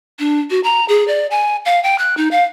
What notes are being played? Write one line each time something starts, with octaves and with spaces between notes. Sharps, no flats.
D4
F#4
A#5
G#4
D5
G#5
F5
G5
F#6
D#4
F5